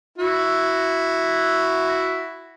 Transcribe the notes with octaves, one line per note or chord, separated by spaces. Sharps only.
E4 F#4